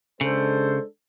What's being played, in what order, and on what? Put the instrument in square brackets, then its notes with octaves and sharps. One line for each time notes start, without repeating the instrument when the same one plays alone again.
[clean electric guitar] C#3 [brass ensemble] G#3 D4 A4 [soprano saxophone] C5